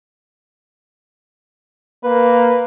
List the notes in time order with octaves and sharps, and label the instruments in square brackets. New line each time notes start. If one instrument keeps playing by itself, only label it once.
[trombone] A#3 [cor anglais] B4